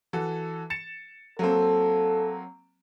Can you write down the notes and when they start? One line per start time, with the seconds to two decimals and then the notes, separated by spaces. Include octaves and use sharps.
0.13 E3 F#4 A4
0.70 A6 C#7 E7
1.39 F#3 A#3 C4 A4